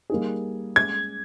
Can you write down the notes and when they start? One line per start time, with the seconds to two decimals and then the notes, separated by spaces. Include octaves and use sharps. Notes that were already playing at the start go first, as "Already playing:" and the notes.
0.10 G3 A#3 D#4 G#4
0.76 G#3 C#4 G#4 G#6